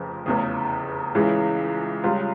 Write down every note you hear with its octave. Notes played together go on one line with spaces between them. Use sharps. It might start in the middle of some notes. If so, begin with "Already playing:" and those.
Already playing: F1 F2 C#3 F3
F1 E2 C#3 G#4
C#2 C#3 E3 G#3
C#2 C#3 G3 F4